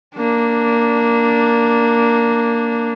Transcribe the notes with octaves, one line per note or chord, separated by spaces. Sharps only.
A#3 D4